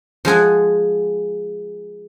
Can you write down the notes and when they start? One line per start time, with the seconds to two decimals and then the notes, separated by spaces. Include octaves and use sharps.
0.25 F3 G#3 G#4 F#5